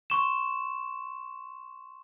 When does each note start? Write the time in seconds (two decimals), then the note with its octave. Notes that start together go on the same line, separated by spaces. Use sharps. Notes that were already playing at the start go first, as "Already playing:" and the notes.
0.10 C6 C#6 E7